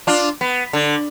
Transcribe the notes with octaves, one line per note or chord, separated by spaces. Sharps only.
D4 F4
B3
D3